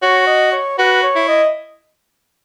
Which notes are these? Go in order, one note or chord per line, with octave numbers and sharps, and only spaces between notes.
F#4 C#5
D#5
C#5
F#4 B4
C#5
E4
D#5